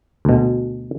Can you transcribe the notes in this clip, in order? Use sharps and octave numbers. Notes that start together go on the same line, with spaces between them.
D2 B2